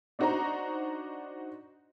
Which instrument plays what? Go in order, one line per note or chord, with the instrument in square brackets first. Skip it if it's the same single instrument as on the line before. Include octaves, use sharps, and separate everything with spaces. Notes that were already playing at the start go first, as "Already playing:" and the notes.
[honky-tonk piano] D4 D#4 F#4 C5 D#5 A#5